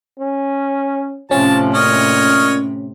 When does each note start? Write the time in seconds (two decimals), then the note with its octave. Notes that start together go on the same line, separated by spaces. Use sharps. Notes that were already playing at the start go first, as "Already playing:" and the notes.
0.19 C#4
1.31 A2 C3 F3 C#4 A5
1.74 A#2 C#5 D#5 F6